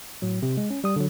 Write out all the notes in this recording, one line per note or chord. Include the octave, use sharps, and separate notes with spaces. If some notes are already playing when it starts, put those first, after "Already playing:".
A2 F#3
C3
G#3
C#4
G3 D#6
D3 F#3